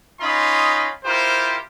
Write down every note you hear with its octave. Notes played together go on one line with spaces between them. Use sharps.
C#4 D#4 F4 D#5 B5 C6
E4 F4 G4 A#4 C5